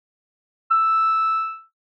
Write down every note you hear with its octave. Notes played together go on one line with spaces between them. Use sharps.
E6